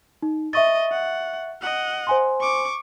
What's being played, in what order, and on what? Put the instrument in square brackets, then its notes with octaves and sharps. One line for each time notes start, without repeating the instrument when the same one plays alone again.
[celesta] D#4
[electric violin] D#5 [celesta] E5 C#6 A6
[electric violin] F#5
D#5 F#5
[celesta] C5 G#5 C6
[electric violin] C#6 D6